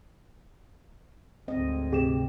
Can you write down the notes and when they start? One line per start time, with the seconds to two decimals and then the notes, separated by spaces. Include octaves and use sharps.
1.48 D2 G#2 C4 D#5
1.92 C3 G4 G#4 E7